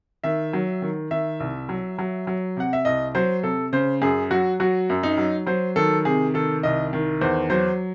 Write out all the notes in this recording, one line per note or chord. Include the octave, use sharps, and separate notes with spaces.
D#3 E5
F#3
D#3
D#3 E5
C2
F#3
F#3
F#3
C3 F#5
E5
C2 D#5
F#3 C5
C3 A4
C#3 C5
F#2 G#4
F#3 F#4
F#3 F#4
F#2
D#4
F#3
F#3 C5
D#3 A4
C3 G#4
D#3 A4
C2 D#5
D#3
E2 C5
F#3 C5